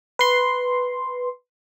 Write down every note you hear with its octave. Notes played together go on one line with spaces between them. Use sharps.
B4 C6